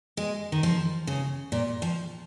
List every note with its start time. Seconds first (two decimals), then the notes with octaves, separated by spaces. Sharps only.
0.17 G#3
0.52 D#3
0.63 F3
1.07 C#3
1.52 A#2
1.82 F3